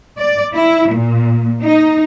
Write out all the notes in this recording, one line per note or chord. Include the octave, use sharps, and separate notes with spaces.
D5
E4
A#2
D#4